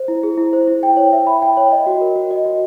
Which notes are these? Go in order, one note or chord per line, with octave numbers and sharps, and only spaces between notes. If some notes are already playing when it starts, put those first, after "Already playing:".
Already playing: C5
E4
G#4
E4
C5
E4
G5
C#5
E5
B5
G5
C#5
D#5
F#4
A#4
F#4
D#5
F#4